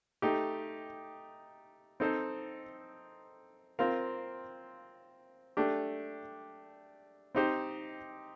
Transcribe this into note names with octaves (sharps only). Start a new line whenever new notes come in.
A3 D#4 G4
C4 D#4 A4 C5
C4 F4 A#4 F5
A3 D4 G4
C4 D#4 G4 C5